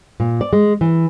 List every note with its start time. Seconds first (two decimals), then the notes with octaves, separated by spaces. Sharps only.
0.20 A#2
0.41 D5
0.53 G#3
0.81 E3